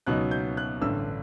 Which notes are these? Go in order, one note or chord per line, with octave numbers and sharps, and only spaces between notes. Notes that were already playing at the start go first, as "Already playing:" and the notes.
C#2 B2 F#3 B3 D#4 F#6
G6
F#6
A1 G2 D3 E6